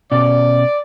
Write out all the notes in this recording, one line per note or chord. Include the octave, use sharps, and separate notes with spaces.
B2 C#4 D5